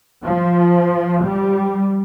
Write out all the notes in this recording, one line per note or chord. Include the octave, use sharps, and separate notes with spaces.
F3
G3